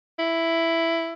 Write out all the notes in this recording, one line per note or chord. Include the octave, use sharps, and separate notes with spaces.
E4